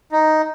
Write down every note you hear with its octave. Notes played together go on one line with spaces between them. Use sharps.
D#4